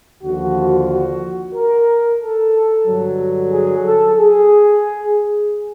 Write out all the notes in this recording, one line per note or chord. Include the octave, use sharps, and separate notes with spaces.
D#2 D3 F3 F#4
F#4
A#4
A4
G2 D3 F#3
G#4
A4
G#4